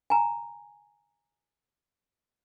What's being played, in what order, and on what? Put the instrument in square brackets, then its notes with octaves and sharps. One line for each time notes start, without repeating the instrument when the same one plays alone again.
[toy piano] G#5 A#5